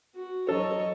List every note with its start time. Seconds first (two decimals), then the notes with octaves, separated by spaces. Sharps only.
0.15 F#4
0.49 F#3 A4 C#5 D#5